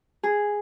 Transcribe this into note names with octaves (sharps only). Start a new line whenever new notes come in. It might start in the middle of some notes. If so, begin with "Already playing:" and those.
G#4